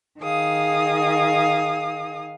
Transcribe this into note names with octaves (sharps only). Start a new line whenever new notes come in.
D#3 G#4 F5 D#6